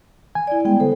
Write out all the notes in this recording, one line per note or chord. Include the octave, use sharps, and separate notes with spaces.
G#5
E4 D5
G3 G#3 B3 G5
D3 B3 A4 C5